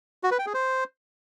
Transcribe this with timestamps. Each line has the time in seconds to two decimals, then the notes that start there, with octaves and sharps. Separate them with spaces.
0.24 F#4
0.31 B4
0.39 G5
0.46 G#4
0.54 C5